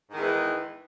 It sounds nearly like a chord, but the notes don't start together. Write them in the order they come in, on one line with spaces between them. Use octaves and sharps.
G#2 D#3 E2 G#3 E3